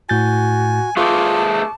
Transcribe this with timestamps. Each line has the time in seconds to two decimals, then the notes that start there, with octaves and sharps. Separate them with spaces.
0.09 A2 F#4 G#5 G6 A6
0.97 A3 F4 G#4 B4 A5 C#6 D6